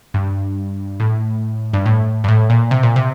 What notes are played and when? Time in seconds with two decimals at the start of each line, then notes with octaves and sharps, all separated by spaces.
0.14 G2
1.00 A2
1.73 G2
1.86 A2
2.24 G2
2.28 A2
2.50 A#2
2.71 C3
2.83 A#2
2.96 C3